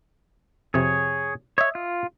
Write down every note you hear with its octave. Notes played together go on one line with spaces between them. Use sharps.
F2 C3 G#4 C#5
C#5 D#5 E5
F4